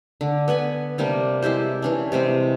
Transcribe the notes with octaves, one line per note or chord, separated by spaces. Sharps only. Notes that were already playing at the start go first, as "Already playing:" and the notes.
D3
B3 B4 G#5 B5
C3 G3 A#3 D4
G#3 E4 G4 C5
E3 C#4 D4
C3 G3 G#3 C4